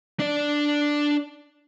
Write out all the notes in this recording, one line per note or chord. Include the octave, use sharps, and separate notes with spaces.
D4 D5